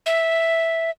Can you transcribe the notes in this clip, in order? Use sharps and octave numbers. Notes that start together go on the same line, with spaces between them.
E5